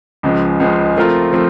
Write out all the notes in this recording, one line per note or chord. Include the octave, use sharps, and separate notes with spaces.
C#2 C#3 F3 G#3
C#2 C#3 F3 G#3
F3 A3 C4 F4 A#4
F3 A3 C4